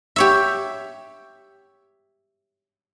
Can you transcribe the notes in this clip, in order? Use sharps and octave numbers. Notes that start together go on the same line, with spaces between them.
G4 C#5 E5